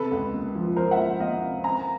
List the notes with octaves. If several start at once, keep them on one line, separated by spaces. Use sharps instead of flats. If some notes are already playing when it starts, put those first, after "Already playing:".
Already playing: C3 A4 B4
C#2
A#3
F3
F3 A#4 C5
E5 F#5
A#3
A#3 D#5 F5
C3
C4 G#5 A#5